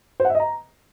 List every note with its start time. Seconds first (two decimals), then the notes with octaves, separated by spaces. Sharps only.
0.20 C5
0.25 F#5
0.30 E5
0.35 D#5
0.40 A#5